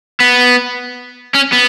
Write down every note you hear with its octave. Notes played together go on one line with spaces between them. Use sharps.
B3
C#4
B3